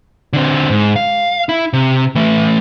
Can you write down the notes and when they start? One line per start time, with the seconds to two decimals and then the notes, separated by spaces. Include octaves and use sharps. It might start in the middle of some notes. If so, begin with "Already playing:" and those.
0.33 D3 C4
0.70 G#2
0.96 F5
1.49 E4
1.73 C3
2.15 E3 A3